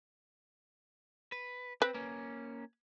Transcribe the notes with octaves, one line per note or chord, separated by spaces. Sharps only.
B4
C4 B4
A#3 C#4